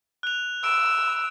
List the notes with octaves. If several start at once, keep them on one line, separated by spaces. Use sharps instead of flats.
F#6 F7
E6 D7